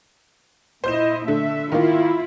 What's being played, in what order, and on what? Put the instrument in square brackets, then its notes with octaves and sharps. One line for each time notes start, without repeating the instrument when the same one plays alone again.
[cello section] A#2 E4 D#5 [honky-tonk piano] C5 G6 E7
[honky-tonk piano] D3 [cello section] A3 E5
[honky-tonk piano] D#3 A#3 [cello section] E4 F4